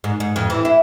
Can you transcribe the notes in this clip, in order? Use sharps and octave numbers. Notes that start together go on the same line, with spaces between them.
G#2
G#2
F2
E3
E4